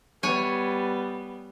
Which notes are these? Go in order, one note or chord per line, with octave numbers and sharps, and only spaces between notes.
G3 B3 C#5 G#5